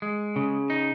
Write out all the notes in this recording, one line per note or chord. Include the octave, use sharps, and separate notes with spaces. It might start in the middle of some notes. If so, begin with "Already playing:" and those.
G#3
C#3
D#4